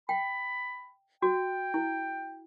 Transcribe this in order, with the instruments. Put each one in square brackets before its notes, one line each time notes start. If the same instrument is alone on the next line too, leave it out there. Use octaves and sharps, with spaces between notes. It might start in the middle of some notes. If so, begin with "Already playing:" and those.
[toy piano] G5 [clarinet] B5
[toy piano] F#4 [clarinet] G5
[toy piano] E4